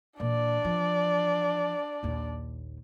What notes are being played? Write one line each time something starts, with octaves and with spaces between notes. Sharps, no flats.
A#2 E3 D4 D5
E3 F3
A#1 D#2